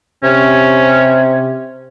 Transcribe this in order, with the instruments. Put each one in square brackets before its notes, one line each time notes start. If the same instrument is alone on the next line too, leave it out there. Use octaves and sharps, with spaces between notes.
[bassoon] C3 [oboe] C#4